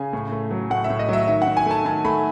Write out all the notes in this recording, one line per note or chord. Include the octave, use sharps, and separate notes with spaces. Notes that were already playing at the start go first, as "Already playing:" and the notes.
Already playing: C#3 G#5
A2
A3
F#3
A2 F#5
E5
A2
D#5
F#3 E5
D#3 E5
F#5
D#3
G#5
A3 A5
D#3 A5
A3 B5